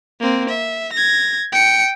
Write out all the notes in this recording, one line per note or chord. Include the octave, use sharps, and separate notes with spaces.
A#3 C4
E5
G#6 A#6
G5 C#7